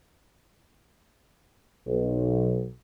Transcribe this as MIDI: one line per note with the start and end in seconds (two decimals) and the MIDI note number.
1.87 2.65 35